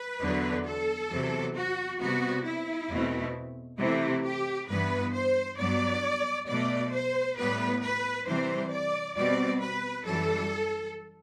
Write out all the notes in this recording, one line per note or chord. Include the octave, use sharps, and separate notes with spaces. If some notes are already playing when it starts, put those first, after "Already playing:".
Already playing: B4
E2 D3 F#3 B3
A4
E2 C3 F#3
F#4
C3 G3 B3 F#4
E4
E2 B2 A3 C4
C3 E3 A3 C4 E4
G4
G2 E3 B3 B4
C5
G2 F#3 B3 D5
B2 F#3 A3 D5
C5
A2 G3 B3 B4
B4
C3 E3 G3 C4 C5
D5
B2 G3 C4 D5
B4
F#2 E3 G3 A4